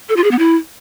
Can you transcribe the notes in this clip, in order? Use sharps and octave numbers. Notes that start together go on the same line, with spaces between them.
A4
F4
G#4
B3
E4